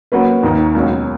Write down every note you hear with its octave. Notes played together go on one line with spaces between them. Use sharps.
F#3 A#3 C#4 F#4 B4
D#2 D#3 A#3
C#2 B2 F#3 C#4